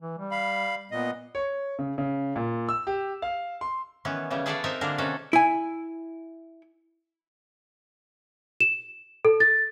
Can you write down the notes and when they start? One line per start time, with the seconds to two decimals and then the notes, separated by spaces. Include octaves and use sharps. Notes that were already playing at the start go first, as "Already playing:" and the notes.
0.01 E3
0.18 G3
0.31 F5 B5
0.91 A#2 B3 D#5
1.35 C#5
1.79 C#3
1.98 C#3
2.36 A#2
2.69 E6
2.87 G4
3.22 F5
3.61 C6
4.05 D#3 E3 B3 C#4
4.30 C#3 E3 G3 C#4
4.46 G#4 A4 B4 D5 F5 F#5
4.64 C4 D#4 A#4 D#5 E5
4.81 D3 G3 A#3 D4 G#4 A#4
4.98 C3 D#3 C#4 F#4 A4
5.33 E4 G#5
8.60 E7
9.25 A4
9.40 A6